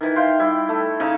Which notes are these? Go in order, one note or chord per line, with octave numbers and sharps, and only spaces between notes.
D#3 E3
F5 G5 C6
G3 E4
A3
C#3 D#4 D6